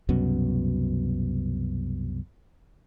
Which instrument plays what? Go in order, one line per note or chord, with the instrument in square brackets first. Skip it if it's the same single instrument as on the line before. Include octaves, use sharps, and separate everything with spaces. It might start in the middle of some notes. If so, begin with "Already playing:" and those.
[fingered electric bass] C2 F#2 B2